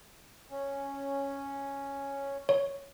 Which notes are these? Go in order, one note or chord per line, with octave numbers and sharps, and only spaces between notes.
C#4
C#5